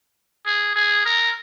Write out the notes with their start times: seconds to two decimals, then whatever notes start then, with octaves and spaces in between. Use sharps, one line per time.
0.46 G#4
0.76 G#4
1.05 A#4